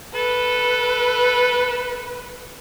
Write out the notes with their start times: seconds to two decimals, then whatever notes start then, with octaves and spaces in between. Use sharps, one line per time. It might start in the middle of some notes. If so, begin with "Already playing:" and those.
0.15 A4 B4